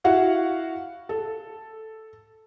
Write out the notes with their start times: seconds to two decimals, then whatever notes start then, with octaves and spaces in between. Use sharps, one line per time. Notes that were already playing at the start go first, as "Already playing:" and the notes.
0.04 E4 F#4 F5 F#5
1.09 A4